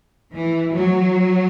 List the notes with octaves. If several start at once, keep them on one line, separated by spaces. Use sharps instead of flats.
E3
F#3